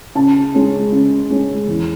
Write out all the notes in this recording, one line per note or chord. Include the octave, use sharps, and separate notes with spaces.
C#3 A5
G#3 C#4
C#3
G#3 C#4
E2